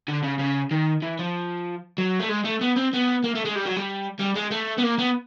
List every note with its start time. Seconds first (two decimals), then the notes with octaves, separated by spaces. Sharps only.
0.08 D3
0.23 C#3
0.39 C#3
0.71 D#3
1.02 E3
1.19 F3
1.98 F#3
2.20 A3
2.29 G#3
2.45 A3
2.61 B3
2.76 C4
2.93 B3
3.24 A#3
3.35 A3
3.45 G#3
3.56 G3
3.66 F#3
3.76 G3
4.19 G3
4.36 G#3
4.51 A3
4.78 B3
4.83 A#3
4.99 B3